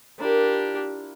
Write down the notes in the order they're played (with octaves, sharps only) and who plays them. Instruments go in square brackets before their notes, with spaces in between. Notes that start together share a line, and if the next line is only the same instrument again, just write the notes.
[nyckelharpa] D4 G4 [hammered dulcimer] E4 F4 A#4